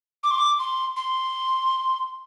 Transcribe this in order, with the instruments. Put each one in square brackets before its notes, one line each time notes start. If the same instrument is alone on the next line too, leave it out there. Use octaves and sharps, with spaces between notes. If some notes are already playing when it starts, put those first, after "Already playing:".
[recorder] D6
C6
D6
C6
C6